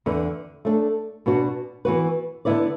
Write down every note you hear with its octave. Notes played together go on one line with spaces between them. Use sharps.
E2 D3 B3
A3 D4 A4
B2 B3 D4 F#4
E3 B3 F#4 B4
D3 B3 E4 B4 D5